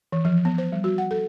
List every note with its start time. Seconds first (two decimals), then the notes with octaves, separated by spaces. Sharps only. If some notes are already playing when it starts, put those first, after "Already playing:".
0.12 E3
0.25 F3
0.45 B3
0.58 C5
0.72 G3
0.84 F#4
0.98 F#5
1.11 A4